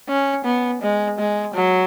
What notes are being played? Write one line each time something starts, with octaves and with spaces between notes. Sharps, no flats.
C#4
B3
G#3
G#3
F#3